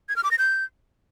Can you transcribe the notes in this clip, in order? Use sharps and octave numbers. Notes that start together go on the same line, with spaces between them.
G#6
F6
D6
A#6
G6